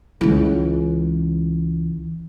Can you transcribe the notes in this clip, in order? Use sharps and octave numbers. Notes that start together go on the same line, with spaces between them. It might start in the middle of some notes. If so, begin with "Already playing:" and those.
C#2 E3